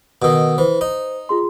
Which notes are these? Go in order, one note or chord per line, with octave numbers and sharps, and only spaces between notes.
B2 D#3 F#5 D#6 E6
E3 C5
D#4
F4 G#4 C6